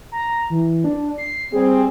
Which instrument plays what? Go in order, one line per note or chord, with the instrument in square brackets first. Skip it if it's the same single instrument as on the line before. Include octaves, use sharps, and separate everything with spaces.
[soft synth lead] A#5
E3
D4
C7
[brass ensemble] G3 C4 [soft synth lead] G#4